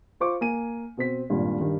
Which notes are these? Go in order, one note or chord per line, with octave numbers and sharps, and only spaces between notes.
F4 C5 C#6 D6
A#3 G#5 D#7
B2 C4 B6
G#1 G2 A#2 G3
G2 D#3